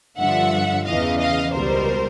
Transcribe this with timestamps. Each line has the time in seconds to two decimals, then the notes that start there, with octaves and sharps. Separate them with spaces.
0.18 G2 D3 F3 E5 F#5
0.85 E2 C#3 E3 D#5 F5
1.19 D#5 F5
1.52 C#2 B2 G3 A#4 C5